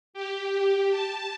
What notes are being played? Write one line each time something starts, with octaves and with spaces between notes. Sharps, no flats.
G4
A5